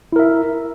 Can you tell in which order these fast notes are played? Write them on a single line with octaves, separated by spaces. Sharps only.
E4 A#4 E5